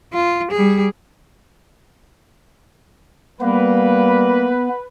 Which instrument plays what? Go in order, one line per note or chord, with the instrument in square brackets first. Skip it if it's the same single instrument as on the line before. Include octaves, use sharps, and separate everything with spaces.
[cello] F4
G3 G#4
[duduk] G3 [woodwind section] A#3 [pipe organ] B3 [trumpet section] B4